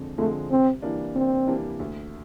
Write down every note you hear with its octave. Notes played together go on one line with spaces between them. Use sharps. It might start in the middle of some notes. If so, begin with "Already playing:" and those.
Already playing: F2 D3 G#3
D3 F3 G#3 A3 C4
C3 C4
E3 G3 A#3 D4
C3 C4
E3 G3 A#3 D4
D2